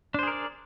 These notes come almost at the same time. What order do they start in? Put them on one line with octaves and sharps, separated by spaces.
D4 C5 G#4 A#4 D5